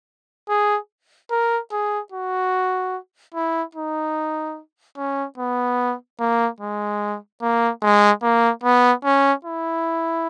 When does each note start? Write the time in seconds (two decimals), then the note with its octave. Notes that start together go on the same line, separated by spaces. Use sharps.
0.49 G#4
1.31 A#4
1.72 G#4
2.12 F#4
3.35 E4
3.75 D#4
4.97 C#4
5.38 B3
6.20 A#3
6.61 G#3
7.42 A#3
7.82 G#3
8.22 A#3
8.64 B3
9.04 C#4
9.45 E4